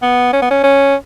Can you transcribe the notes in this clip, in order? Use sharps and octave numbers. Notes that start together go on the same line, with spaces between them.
B3
C#4
B3
C#4
C#4